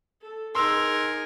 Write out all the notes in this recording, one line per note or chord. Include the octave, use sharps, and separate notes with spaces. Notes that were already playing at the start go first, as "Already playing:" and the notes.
A4
D#4 G#4 A#4 C6 E6